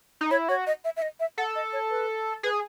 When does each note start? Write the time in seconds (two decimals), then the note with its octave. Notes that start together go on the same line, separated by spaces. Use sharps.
0.21 D#4
0.31 E4 C#5
0.49 F#4 C#5
0.67 D#5
0.85 E5
0.97 E5
1.02 D#5
1.20 E5
1.38 A4 F#5
1.55 D#5
1.73 C#5
1.90 B4
2.43 G#4 B4